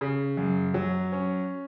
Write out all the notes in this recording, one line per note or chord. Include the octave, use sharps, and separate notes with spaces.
C#3
F#2
F#3
C#4